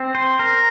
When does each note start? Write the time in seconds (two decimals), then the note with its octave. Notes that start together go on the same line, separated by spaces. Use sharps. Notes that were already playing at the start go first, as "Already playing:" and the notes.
Already playing: C4
0.15 C5
0.39 A#4